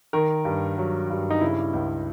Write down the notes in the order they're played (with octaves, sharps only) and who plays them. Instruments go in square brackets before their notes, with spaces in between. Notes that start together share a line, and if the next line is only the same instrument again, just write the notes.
[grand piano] D#3 A#4
G2
F#3
G2
D#4
C#3 E4
C#2